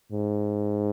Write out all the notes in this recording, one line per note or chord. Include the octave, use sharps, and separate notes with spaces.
G#2